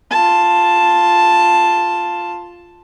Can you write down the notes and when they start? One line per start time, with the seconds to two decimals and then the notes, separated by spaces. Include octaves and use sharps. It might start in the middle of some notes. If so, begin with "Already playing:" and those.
0.11 F4 A5